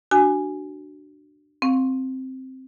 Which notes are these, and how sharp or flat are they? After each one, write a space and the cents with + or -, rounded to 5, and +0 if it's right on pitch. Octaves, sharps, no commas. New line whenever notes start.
D4 +15 F#4 +20 G#5 +0
C4 +0 F5 +25 C#6 +0